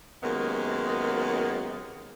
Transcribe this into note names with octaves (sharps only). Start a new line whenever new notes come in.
F#2 C3 D#3 G#3 A#3 B3